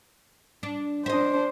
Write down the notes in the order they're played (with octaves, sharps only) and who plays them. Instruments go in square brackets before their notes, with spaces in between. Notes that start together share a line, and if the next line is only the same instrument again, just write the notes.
[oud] D4
[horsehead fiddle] D4 C5 [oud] D#5 E5